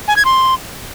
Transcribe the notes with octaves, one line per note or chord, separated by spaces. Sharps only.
G#5
G#6
C6